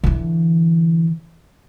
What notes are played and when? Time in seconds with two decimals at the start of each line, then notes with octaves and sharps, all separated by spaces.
0.03 D3 E3